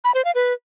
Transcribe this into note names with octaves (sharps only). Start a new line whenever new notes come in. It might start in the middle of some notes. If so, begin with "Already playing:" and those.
B5
C5
F5
B4